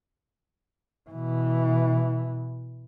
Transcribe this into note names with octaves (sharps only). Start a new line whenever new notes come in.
B2 E3